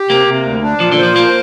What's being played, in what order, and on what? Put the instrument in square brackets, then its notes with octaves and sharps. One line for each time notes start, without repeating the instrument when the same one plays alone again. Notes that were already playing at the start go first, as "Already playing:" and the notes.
Already playing: [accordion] G4
[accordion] C3 [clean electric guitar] A#3
[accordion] C3
D2
D4
[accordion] A#2 [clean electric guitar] F3
[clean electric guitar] D3
[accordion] C5
[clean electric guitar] F3
[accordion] F3 [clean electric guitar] A#3